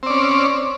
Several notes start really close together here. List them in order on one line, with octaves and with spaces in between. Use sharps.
C4 D5 C#4